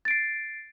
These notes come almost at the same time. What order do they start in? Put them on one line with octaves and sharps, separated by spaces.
A6 D7 C7